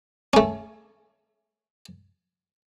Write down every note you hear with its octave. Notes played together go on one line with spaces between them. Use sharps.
A3 C#4